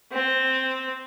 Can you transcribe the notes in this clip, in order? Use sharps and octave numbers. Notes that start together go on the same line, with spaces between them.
C4